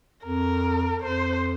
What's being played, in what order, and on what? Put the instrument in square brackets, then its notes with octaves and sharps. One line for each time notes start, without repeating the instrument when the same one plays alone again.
[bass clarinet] F2 [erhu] A#4
[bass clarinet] F2 [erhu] C5